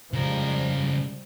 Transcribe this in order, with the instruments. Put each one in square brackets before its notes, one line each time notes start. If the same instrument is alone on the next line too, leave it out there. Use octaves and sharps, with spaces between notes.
[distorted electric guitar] C#3 A#4 [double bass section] F3 G3 G#3